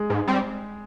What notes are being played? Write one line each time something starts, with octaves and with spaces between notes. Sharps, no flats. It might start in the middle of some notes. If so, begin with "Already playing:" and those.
Already playing: G#3 G#4
G#2
G3 C4